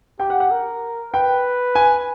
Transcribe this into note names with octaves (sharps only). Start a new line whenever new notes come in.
G4 G5
F#5
F#5
A#4
B4 G5
G#5